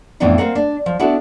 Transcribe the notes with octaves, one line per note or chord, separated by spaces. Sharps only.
F2 A2 E3 B3 D4 D#4
A#3 C4 A#4 F#5
D4
F3
B3 D4 E4 F#4 A4